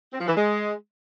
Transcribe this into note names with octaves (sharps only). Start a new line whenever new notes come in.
C4
F3
E3
G#3